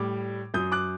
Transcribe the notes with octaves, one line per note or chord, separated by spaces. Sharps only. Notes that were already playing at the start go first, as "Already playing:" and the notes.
Already playing: A2 G3 D6
F#2 F#3 D#6 G6
D6 F#6